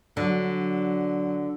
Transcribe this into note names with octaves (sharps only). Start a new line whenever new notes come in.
D3 F#3